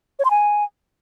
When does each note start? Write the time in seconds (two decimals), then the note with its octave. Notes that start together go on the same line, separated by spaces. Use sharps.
0.19 C#5
0.25 C6
0.31 G#5